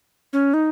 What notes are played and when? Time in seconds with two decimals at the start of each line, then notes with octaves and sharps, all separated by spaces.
0.33 C#4
0.54 D#4